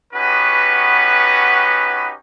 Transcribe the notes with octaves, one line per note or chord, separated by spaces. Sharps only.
B3 C#4 D#4 F#4 G4 B4